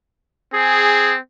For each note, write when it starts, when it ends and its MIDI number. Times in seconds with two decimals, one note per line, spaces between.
0.54 1.19 60
0.54 1.14 68